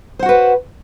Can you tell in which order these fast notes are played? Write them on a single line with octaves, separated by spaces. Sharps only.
C5 F#5 F#4 B4